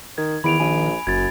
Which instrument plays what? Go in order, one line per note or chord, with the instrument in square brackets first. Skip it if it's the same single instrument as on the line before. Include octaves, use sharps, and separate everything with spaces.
[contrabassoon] D#3 [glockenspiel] G#6
[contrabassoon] E2 [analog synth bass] D#3 [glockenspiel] B5 D7 F7
[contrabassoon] A#1 [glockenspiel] G#5
[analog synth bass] F#1 [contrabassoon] F#2 [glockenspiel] G#6 A6